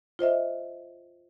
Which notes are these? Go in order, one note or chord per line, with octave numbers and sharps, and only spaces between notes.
F4 C5 D#5 E5